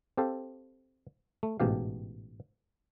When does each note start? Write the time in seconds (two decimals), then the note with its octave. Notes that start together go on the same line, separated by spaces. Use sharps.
0.17 C4 G4 A4 F5
1.43 A3
1.60 A1 G#2 B2 G4 F5